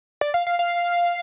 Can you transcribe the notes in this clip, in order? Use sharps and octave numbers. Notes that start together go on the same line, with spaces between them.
D5
F5
F5
F5